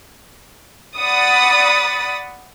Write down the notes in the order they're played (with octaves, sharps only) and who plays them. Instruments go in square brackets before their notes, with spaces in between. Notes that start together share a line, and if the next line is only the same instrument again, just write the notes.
[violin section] D5 F#5 B5 D#6 A6